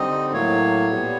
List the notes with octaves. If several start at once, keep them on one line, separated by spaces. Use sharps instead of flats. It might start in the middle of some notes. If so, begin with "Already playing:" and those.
Already playing: D3 G3 C4 D#4 D#5
A2 F#3 A#3 C#5
A#2 G3 B3